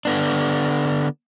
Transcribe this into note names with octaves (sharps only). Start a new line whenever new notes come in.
D3 B3 D4